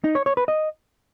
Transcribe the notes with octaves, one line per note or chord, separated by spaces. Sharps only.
D#4
C#5
C#5
B4
D#5